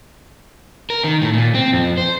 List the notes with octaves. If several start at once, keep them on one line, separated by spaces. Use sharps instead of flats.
A#4
D#3
A2
A#2
C4
F2
C5